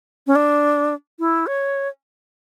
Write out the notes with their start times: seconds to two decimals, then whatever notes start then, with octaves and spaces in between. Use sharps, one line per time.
0.27 C#4
0.35 D4
1.19 E4
1.47 C#5